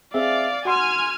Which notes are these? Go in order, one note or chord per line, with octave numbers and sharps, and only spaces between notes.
C4 G#4 D5 E5 F5
F#4 F#5 G#5 C6 F6